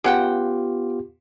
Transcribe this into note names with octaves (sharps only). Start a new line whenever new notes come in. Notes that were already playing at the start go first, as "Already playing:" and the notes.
C#3 B3 F4 G4 F#5 G5